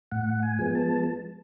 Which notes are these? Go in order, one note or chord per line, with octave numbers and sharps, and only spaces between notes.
A2 F#5
G#5
F3 G#3 B3
A5